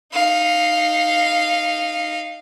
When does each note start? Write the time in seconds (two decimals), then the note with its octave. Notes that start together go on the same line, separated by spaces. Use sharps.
0.13 D#4 F5